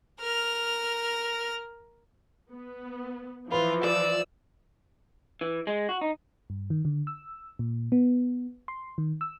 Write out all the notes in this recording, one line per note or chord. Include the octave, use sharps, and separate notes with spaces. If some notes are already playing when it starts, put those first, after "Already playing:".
A#4 F6
B3
E3 F3 F4 B4
D5 E6
E3
G#3
F#4
D#4
G2
D#3
D3
E6
A#2
B3
C6
D#3
E6